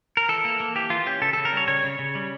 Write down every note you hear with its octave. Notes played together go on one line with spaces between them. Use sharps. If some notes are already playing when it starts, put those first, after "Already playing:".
A#4
E3 A4
A#3
A#3
E3 G4
E3 F4
C#4 G4
C#3 A4
C#3 A4
A#4
G3 C#5
C#3 C#5
C#3
C#3
G3